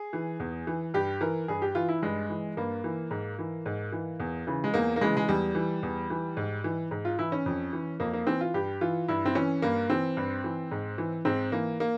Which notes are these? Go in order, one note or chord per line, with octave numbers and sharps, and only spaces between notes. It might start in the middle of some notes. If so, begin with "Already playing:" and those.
Already playing: G#4
E3
E2
E3
G2 G4
E3 A#4
G2 G#4
G4
E3 F4
E4
G2 G#3
E3
G2 A#3
E3
G#2
E3
G#2
E3
E2
C#3 E3
G#3
E2 A#3
A#3
C#3 E3 G#3
G#3
E2 G3
E3
E2
E3
G#2
E3
G#2
F4
E3 E4
C#4
F2
E3
F2 A#3
A#3
E3 C4
F4
G2 G4
E3 F4
G2 E4
C4
E3 C#4
G2 A#3
E3 C4
G2
E3
G#2
E3
G#2 C4
E3 A#3
A#3